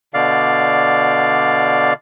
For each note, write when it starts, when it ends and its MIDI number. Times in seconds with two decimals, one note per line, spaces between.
0.14 1.93 47
0.14 1.93 50
0.14 1.93 74
0.14 1.93 77